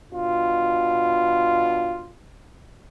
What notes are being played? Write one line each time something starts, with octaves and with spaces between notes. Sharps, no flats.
B2 D4 F4